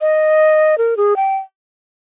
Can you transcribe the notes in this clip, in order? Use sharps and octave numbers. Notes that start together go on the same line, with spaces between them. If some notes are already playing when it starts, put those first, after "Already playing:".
D#5
A#4
G#4
G5